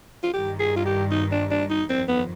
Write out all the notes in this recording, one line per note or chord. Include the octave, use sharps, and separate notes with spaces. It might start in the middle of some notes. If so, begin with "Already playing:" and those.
F4
G2 D#3 G3 G4
G#4
F4
G4
D#4
D4
D4
D#4
G1 F2 D#3 C4
B3